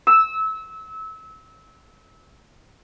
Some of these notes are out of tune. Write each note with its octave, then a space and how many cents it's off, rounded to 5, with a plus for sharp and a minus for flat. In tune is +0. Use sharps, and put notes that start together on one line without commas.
E6 -25